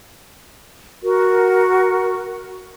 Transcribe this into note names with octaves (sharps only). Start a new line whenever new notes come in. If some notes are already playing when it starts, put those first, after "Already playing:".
F#4 A#4